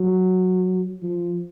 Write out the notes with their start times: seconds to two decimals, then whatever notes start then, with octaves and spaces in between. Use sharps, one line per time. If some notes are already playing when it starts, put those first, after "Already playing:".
Already playing: F#3
1.03 F3